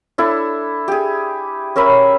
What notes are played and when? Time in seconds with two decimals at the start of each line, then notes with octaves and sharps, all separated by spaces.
0.18 D4 E4 A4
0.88 G4 G#4
1.76 C#4 A#4 E5 B5